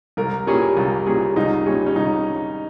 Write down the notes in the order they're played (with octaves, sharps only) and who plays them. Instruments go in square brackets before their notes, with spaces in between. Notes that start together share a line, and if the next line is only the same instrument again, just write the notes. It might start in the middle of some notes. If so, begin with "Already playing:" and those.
[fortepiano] C2 [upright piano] A#4
[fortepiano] A#2 G3 C#4 G#4
C2
A#2 G3 C#4 G#4
[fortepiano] C2 [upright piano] D#4
[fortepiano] A#2 G3 C#4 G#4
[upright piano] C#4
[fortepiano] C2 [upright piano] D#4